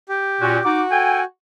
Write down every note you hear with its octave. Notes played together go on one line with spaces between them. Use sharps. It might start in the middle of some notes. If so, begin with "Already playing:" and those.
G4
A#2 C#4 F#4
D#4 F#4 D6
A4 G5 G#5